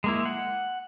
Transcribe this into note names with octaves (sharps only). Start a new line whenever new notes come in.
G#3 A#3 E4
F#5